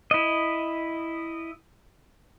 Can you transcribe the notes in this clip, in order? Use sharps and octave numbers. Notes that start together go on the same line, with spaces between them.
E4 D#5